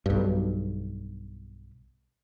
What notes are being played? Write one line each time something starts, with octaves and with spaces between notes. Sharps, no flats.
B1 G2